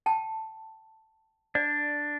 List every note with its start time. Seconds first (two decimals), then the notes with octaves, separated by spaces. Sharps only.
0.06 G5 A5
1.55 D4 D5